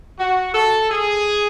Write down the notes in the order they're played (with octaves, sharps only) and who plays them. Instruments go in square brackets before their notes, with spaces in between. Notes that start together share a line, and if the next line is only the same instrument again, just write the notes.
[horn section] F#4
A4
G#4